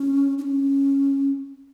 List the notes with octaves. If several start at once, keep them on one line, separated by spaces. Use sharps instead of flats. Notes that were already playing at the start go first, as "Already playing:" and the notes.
Already playing: C#4
D4
C#4